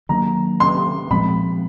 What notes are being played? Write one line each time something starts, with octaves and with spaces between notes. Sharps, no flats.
D#3 F#3 A#3 D4 A#5
C6
A#2 F3 G#3 C4 B5